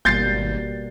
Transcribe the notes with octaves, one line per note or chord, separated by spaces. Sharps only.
G#1 B2 G3 A#3 G6 A6 C7